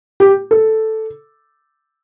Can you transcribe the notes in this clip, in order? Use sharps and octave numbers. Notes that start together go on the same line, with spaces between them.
G4
A4